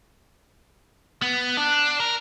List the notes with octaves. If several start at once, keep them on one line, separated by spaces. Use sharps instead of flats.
B3
D4
A#4